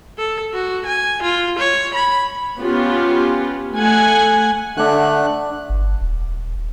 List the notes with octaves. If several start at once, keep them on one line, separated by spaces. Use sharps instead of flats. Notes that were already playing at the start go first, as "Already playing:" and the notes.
A4
F#4
G#5
F4
C#5
B5
B3 C#4 F4 G4
A3 F#5 G#5
D3 A3 D4 F#5 F#6
G1
D#1